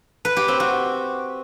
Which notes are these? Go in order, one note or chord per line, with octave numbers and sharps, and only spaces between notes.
B4
G4
C4
F#4